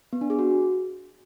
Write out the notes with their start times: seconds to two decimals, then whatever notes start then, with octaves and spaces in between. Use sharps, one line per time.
0.13 B3
0.21 D4
0.30 G#4
0.39 F#4